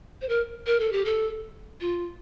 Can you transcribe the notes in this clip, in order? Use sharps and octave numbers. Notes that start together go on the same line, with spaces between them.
C5
A#4
A#4
A4
G4
A4
F4